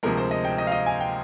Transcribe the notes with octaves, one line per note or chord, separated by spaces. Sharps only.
D2 C3 F3 G#3 A#4
C5
D#5
G5
D#5
F5
D#5
G#5
G5